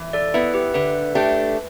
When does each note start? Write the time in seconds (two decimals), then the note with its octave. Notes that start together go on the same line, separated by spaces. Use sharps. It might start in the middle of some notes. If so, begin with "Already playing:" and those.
Already playing: E3
0.13 A4 D5
0.34 B3 E4 B4 E5
0.54 G4 B4
0.74 D3 B4 E5
1.15 A3 D4 G4